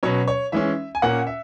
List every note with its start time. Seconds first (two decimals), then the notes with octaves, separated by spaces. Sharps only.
0.03 B2 F#3 C#4 C#5
0.28 C#5
0.52 E3 G#3 C#4 E5
0.95 G#5
1.02 A#2 A#3 C#4 F#5
1.27 E5